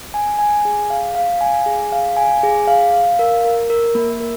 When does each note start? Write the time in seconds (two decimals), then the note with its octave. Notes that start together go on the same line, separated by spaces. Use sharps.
0.14 G#5
0.39 G#5
0.65 G#4
0.90 F5
1.15 F5
1.41 G#5
1.66 G#4
1.92 F5
2.17 G#5
2.43 G#4
2.68 F5
2.93 F5
3.19 A#4
3.45 A#4
3.70 A#4
3.95 A#3
4.20 A#4